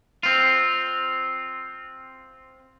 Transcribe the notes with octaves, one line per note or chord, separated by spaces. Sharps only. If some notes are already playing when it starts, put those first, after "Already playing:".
C4 F4